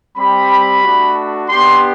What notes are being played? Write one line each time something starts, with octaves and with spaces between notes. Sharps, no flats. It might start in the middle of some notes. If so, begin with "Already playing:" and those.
G3 C4 G4 B5
A3 D4 F#4
B3 D4 G4 C6